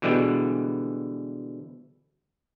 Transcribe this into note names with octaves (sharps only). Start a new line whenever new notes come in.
B2 D3 E3 G3 G#3 B3